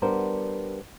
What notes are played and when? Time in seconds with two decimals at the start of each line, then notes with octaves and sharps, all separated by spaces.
0.02 G3 B3 D4 A#4 C5